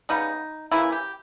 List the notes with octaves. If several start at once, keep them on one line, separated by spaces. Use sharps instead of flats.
C#3 G3 B3 D#4
C#3 E3 A#3 E4
G4